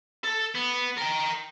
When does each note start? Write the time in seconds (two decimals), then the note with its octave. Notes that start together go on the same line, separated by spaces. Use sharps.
0.24 A4
0.55 B3
0.97 A#4 G5